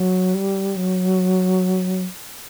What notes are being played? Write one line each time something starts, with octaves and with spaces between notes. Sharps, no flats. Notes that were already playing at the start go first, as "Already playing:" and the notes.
Already playing: F#3
G3
F#3